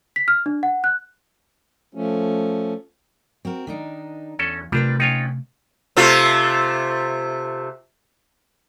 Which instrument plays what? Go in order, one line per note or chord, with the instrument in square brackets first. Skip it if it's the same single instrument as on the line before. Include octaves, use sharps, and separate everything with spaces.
[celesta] B6
F6
D4
F#5
F#6
[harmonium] F3 A3 C#4
[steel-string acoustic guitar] C4 F#4 A#4
D#3 D4 D#4
[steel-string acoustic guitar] E2 [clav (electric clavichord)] C#4 A4
[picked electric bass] C3 A3 [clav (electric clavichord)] G3 D4 [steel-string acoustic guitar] F4 A#4 B4
[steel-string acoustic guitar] C#4 B4 G5 [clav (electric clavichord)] D#4 F4 C#5
[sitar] C3 A3 F4